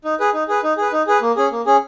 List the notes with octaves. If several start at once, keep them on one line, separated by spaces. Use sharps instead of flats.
D#4
G#4 B4
D#4
G#4 B4
D#4
G#4 B4
D#4
G#4 B4
A#3
C#4 G#4
A#3
C#4 G#4